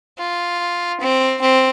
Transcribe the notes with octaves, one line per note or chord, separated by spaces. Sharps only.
F4
C4
C4